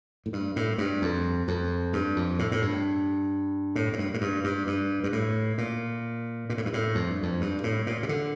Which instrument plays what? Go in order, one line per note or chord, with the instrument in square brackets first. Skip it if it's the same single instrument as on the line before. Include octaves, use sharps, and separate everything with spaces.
[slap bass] A2
G2
A2
G2
F2
F2
G2
F2
A2
A2
G2
A2
A2
G2
A2
G2
G2
G2
G2
A2
A#2
A#2
A2
G2
A2
F2
G2
F2
G2
A2
A#2
C3
D3